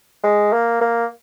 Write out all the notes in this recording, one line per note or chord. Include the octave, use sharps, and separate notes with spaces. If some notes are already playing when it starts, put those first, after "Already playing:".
G#3
A#3
A#3